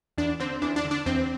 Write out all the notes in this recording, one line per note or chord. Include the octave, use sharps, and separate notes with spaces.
E2 D4
D3 C4
E2 D4
D4
D3
D4
E2 C4